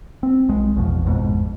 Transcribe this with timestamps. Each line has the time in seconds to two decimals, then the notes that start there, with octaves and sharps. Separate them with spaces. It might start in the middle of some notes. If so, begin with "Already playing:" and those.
0.23 C4
0.48 B1 G#3
0.76 A1 E2 B2 F3
1.05 A1 F2 G#2 B2